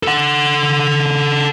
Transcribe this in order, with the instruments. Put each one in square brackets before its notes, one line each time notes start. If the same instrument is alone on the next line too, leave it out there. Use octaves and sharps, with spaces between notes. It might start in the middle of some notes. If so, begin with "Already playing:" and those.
[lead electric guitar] A4 F#5